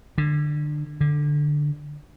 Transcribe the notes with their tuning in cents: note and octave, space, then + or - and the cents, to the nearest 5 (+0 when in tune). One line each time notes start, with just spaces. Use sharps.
D3 +25
D3 +10